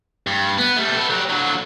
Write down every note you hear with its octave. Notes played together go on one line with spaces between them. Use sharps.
G2
B3
G3 A3
B3 A4
F#3 G4
D3 F#3